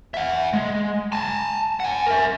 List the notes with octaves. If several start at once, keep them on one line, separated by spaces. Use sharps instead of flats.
E5 F#5
G#3
G#5 A5
F#5 G#5
A#4 E5